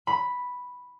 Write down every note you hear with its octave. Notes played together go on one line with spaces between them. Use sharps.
B5